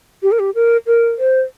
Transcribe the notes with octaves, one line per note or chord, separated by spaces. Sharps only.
G4
A#4
G4
A#4
A#4
C5